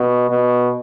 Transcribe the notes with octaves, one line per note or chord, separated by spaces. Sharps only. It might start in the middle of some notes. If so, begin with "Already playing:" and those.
Already playing: B2
B2